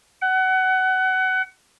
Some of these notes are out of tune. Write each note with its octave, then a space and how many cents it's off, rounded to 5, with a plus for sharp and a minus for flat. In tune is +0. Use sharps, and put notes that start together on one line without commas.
F#5 +25